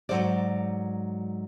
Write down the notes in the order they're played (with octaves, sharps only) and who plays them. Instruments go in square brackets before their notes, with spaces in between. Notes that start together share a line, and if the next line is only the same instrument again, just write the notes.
[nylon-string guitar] G#2 D#3 F#3 A4 C5 D5